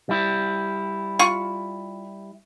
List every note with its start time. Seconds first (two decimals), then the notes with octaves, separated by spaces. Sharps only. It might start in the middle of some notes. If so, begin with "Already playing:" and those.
0.09 G3 E4
1.19 F4 C#6